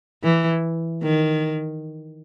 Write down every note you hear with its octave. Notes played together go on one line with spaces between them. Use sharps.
E3
D#3